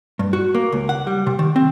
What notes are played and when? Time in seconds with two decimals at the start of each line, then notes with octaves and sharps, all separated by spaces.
0.19 G2
0.33 F#4
0.55 A#3
0.72 C#2
0.89 F#5
1.07 G3
1.27 C3
1.39 D#3
1.56 C4